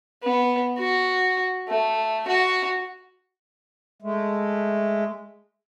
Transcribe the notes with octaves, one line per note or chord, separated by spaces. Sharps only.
B3
F#4
A3
F#4
G#3 A3